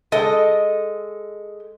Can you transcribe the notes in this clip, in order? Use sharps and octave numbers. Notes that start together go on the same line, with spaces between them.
G#3 A4 D#5